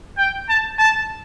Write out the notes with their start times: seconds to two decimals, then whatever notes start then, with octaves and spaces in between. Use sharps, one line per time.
0.18 G5
0.49 A5
0.79 A5